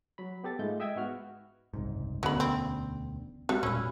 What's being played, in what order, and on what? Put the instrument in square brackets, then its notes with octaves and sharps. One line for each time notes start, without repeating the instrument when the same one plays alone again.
[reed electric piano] F#3 B5
B3 G4 A4 A6
G#2 G#3 A3 F4 G6
D#5 E5 G5 E6 G#6
G#2 B3 F#4 F6
[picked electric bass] F#1 C2 G#2
[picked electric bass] E1 D2 D3 [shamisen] F#3 B5 [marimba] B3 C#4
[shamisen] C4
[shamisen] G3 [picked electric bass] G#3 C4 [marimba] F#4
[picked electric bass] E1 G2 A#2 [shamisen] C#4 [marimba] B5 E6